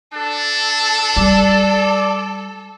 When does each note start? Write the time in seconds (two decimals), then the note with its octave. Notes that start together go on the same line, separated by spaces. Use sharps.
0.13 D4 A4
1.16 G3 D5